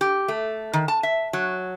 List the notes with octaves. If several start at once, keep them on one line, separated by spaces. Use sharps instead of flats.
G4
A3
D#3
A5
E5
F#3